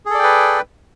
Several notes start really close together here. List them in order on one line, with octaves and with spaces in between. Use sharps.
G#4 A4 D5 G5 B4